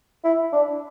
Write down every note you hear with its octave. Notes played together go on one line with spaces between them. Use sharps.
E4
D4